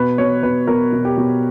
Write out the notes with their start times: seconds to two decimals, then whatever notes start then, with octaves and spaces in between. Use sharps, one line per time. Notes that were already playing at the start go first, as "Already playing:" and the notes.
Already playing: B2 B4
0.18 B2 C#5
0.43 B2 B4
0.68 B2 A#4
0.92 B2
1.05 G4
1.17 B2